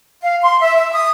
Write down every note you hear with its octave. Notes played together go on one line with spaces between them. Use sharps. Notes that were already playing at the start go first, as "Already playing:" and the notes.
F5
C6
E5
E5
D#6